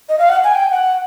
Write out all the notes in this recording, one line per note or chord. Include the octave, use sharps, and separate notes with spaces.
D#5
F5
F#5
G#5
G5
F#5